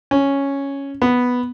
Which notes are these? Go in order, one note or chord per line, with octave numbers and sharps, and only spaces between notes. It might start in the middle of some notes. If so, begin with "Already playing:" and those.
C#4
B3